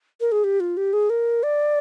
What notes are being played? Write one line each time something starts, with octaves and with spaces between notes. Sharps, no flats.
A#4
G#4
G4
F4
G4
G#4
A#4
D5